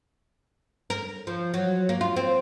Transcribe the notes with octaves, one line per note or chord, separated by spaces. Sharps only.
A#4
F3
F#3
A#3
F4
C4